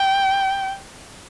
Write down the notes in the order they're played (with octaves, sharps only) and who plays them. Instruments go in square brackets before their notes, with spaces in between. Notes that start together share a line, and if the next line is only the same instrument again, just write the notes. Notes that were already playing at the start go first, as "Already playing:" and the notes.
Already playing: [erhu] G5